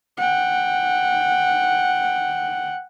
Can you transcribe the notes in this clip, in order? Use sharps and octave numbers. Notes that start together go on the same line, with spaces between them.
F#5 G5